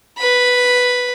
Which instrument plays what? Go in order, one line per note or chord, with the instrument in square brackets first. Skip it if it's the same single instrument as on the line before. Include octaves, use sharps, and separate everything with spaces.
[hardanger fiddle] B4 B5